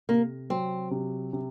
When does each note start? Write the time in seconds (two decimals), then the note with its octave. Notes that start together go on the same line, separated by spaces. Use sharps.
0.09 C3 A#3
0.50 F#3 C4
0.91 C3
1.33 C3